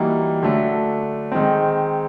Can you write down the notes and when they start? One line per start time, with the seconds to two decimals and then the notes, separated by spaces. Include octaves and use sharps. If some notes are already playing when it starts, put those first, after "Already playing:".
Already playing: E3 G3 A#3 D#4 F#4
0.43 D3 F#3 A3
1.32 D#3 G#3 C4